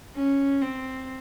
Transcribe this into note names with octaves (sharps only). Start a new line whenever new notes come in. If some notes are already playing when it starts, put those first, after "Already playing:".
C#4
C4